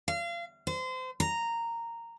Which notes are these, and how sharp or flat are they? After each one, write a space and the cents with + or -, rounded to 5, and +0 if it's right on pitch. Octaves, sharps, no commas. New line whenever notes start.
F5 -30
C5 -30
A#5 -10